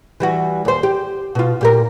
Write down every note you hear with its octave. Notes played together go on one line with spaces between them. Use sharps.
E3 G3 F#4
D#2 C5
G4
B2 F4
A#2 G4 A#4